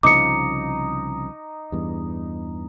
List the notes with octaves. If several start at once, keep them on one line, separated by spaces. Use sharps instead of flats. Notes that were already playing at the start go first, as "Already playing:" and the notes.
C2 C#3 F3 D#4 D6 C#7
E2 G2